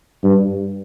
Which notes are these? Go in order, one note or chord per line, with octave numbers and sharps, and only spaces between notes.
G2